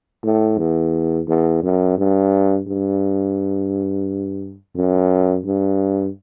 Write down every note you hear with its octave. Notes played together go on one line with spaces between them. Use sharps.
A2
E2
E2
F#2
G2
G2
F#2
G2